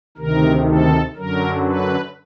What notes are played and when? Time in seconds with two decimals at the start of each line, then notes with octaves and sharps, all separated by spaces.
0.17 D2 C3 D#3 A#4
0.67 A4
1.16 F#2 D3 F#3 A#4
1.66 B4